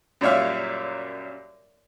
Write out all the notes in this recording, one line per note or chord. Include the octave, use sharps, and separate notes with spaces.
F#2 A#2 G3 C#5 E5 F5